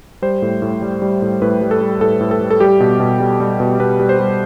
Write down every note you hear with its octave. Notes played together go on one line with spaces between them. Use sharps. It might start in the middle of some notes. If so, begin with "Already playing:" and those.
G3 C5
A2
A2
G3
G3
A2
A2 B4
G3
A4
G3
A2 A4
A2
A4
G3
A4
G3 G4
B2
B2
G3
G3
B2
B2 B4
G3
C5
G3